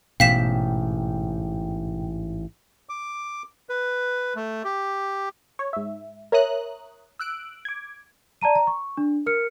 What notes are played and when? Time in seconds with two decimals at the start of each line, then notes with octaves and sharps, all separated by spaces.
0.20 A1 G#2 B2 F5 G5 B6 E7
2.89 D6
3.69 B4
4.36 A3
4.64 G4
5.59 C#5
5.73 G#2 E5
6.32 A#4 C#5 E5 A#5 D#6 F#6
7.20 E6 F#6 D7
7.65 D6 G#6
8.41 D5 A5 A#5 D#7
8.55 A#5
8.67 C#6
8.97 D4
9.26 A#4 F6 C#7